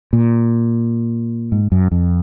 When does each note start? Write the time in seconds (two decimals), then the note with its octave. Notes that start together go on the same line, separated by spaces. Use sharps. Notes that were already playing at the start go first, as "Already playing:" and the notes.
0.13 A#2
1.52 G#2
1.72 F#2
1.92 F2